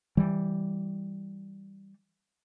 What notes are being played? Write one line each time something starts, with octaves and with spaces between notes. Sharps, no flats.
E3 G3